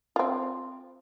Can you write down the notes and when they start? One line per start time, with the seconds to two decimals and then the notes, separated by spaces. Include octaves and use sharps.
0.16 C4 F4